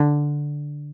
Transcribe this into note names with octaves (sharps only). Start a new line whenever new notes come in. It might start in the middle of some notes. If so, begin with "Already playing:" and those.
Already playing: D3